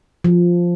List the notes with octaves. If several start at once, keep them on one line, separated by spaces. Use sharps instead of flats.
F3